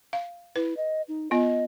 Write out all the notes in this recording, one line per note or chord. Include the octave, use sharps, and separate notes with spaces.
F5
E4 B4
D#5
D#4
B3 F4 D#5